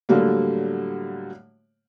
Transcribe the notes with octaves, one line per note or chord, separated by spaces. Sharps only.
A2 D3 F#3 G3 A#3